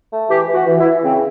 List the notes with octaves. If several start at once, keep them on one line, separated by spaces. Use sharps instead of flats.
A3
E3 G4
E3
F#4
E3
E4
E3
C#3 C4